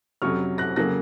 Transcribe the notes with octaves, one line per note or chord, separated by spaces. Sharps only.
F2 C3 F#3 C#4 C#6 F6
F#6 A#6
F2 C#3 F#3 A#3 F#6 A#6